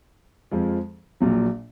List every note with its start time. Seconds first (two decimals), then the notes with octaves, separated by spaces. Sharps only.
0.51 F2 F3 G#3
1.20 A#1 A#2 F#3